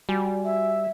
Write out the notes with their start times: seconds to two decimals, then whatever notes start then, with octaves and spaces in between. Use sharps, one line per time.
0.09 G3 F#4 G#5
0.44 E5